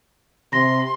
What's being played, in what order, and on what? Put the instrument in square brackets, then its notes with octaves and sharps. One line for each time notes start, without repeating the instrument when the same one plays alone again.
[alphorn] C3 [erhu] C6 [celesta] A#6